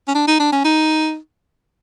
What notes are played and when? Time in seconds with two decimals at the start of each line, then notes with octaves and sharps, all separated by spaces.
0.08 C#4
0.15 D4
0.28 D#4
0.40 D4
0.52 C#4
0.65 D#4